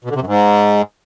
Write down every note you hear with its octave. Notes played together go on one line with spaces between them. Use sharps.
B2
D3
C3
F#2
G#2